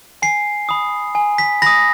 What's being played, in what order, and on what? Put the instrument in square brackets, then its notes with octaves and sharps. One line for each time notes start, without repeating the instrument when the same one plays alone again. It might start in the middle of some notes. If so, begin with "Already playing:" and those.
[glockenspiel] G#5 C7
B5 D#6
G#5
B6
B5 D#6 A#6